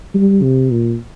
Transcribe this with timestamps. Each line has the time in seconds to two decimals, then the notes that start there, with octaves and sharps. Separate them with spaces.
0.14 G3
0.42 C3
0.71 A#2